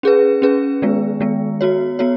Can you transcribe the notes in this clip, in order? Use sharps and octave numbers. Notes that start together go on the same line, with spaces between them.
C#4 G#4 B4
C#4 G#4 B4
D#3 G#3 B3
D#3 G#3 B3
B3 F#4 C#5
B3 F#4 C#5